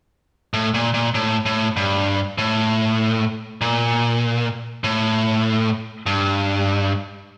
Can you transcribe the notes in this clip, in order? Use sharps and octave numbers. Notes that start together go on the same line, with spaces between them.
A2
A#2
A#2
A2
A2
G2
A2
A#2
A2
G2